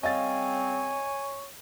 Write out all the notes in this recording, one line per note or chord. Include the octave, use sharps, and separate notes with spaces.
C#3 G3 C4 C#5 D#5 F5 G#5 A6